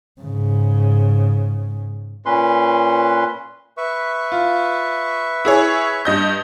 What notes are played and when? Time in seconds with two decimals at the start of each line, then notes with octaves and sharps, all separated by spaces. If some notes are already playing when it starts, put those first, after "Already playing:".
0.21 G#2 C#3
2.26 A#2 C#4 B4 C6
3.77 B4 E5 C#6
4.32 F4
5.45 E4 G#4 C#5
6.05 G2 D#5 G6